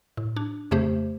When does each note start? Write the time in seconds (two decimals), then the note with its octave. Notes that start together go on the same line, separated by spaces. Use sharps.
0.17 A2
0.36 D4
0.71 F2 C#3 A3 G4 C5